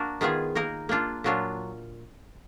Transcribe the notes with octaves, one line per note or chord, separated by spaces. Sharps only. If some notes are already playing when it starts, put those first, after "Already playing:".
Already playing: A#3 D4 F#4 A#4
D#3 G#3 B3 F4 G#4
A#3 D#4 A#4
A#3 D4 F4
A#2 F#3 D4 F4